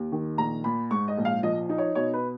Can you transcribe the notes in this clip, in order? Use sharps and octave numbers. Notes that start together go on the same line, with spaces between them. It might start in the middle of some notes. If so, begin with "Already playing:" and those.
Already playing: D#2
D#3
A#1 A#5
A#2 B5
G#2 C#6
D#5
A#1
F5
F3 D#5
D#4
C#5
B2 C#5
B4